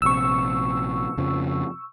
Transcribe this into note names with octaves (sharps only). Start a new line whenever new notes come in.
A#1 C3 C#6 E6
F2 C#3 F3